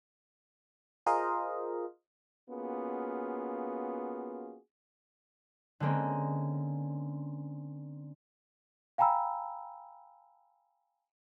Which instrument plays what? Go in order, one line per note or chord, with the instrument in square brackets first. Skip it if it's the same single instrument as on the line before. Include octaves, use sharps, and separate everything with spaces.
[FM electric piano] F4 G#4 A#4 C5 D#5 F5
[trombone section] A#3 B3 C#4 F4 F#4 G#4
[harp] D3 G#3 A#3 C4 C#4
[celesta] F5 G5 G#5 A#5 B5 E6